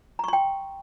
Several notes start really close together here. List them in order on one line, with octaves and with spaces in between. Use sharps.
A#5 C#6 C6 G5